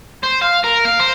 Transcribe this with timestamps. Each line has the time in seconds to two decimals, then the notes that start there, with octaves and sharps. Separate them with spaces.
0.24 C5
0.42 F5
0.64 A#4
0.85 F5
1.00 C5